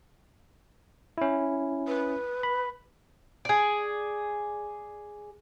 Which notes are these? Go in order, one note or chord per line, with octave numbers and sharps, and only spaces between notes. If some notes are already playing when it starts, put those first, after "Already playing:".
C#4 E4
B4
B5
G#4 D5